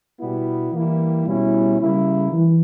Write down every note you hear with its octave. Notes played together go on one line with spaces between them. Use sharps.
B2 G3 B3 E4
E3 G3 A#3 E4
B2 G3 C#4 E4
C#3 G3 A#3 E4
E3